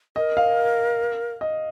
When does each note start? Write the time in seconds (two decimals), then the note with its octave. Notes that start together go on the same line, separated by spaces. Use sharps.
0.16 A#4 D#5
0.37 F5
1.41 D#5